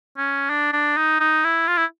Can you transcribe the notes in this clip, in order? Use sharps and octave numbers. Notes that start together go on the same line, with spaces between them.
C#4
D4
D4
D#4
D#4
E4
F4
E4